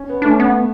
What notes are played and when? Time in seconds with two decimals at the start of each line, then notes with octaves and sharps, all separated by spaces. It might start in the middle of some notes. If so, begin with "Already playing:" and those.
Already playing: C#4
0.09 B3
0.22 A3 D4
0.31 C#4
0.40 B3